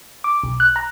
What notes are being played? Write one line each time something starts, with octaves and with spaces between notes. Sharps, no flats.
D6
B1
F#6
A#5